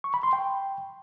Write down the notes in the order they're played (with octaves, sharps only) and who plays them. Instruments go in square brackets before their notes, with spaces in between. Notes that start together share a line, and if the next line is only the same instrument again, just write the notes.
[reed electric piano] C#6
B5
C6
G5